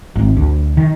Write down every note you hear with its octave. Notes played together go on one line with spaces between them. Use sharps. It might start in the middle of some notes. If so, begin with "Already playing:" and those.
G#1
D2
D#3